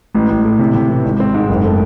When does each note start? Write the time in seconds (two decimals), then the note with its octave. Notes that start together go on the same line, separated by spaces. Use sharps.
0.14 A1
0.30 A1
0.45 A2
0.59 C3
0.75 C3
0.90 E3
1.05 G#1
1.20 C4
1.34 G#2
1.49 F#1
1.64 A3